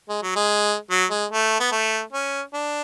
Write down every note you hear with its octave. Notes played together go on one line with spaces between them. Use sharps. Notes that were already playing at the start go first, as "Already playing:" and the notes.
G#3
F#3
G#3
F#3
G#3
A3
B3
A3
C#4
D4